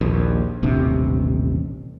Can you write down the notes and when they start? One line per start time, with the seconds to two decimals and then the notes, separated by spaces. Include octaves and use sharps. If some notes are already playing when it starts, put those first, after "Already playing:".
0.01 A#1 D#2
0.63 D#1 A1 C3 D4